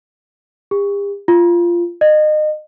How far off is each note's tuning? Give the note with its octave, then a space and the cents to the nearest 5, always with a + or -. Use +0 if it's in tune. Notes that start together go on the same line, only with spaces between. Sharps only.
G4 +45
F4 -15
D#5 -30